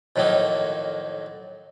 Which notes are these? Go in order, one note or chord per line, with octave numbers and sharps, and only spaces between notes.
F2 A2 D#3 F#3 A#3 D#4